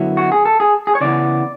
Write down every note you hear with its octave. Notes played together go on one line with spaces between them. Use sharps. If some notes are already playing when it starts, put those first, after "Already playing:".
Already playing: F#2 D3 F#3 B3 E4
F#4
G#4
A4
G#4
G#4
C#5
C#3 E3 B3 D5